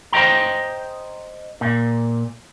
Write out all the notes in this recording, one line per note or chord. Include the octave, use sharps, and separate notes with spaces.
C5 D#5 G5 A#5
A#2